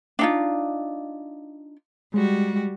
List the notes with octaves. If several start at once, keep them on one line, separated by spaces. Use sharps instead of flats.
D4 D#4 F4
G3 G#3 F#4